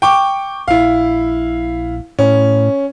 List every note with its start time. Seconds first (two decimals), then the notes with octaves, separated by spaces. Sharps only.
0.02 G5 C#6 D6
0.68 A#1 E4 F5
2.19 A2 C#4